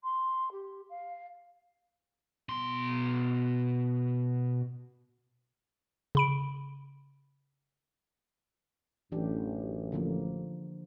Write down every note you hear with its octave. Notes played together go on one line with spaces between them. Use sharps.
C6
G4
F5
B2 C6
C#3 B5 D7
A1 F#2 E3 D4 G4
D3 F3 A#3